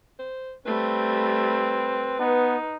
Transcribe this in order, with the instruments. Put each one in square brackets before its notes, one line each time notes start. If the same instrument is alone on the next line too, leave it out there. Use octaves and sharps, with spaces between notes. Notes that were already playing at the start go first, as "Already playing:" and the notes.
[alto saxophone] C5
[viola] G3 A3 [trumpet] C4 [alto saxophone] B4
[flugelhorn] B3 [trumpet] D#4